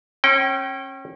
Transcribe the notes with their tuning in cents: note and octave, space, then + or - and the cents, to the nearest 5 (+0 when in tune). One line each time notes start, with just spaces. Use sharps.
C#4 -35 G5 -20